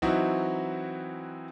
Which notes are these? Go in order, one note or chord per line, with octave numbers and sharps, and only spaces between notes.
E3 F#3 C4 D#4 E4 F#4